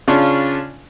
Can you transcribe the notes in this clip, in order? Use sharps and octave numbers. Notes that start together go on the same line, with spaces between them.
C#3 C#4 D4 F4 C#6